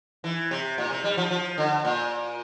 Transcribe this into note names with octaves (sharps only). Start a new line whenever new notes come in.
E3
C3
A#2
C3
G3
F3
F3
D3
A#2